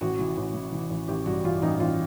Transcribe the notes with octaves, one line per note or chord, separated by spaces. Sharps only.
A1 F#4
E3
A1
E3
E3
A1
A1 G4
G2 F#4
E3 F4
A1 D#4
A1 F4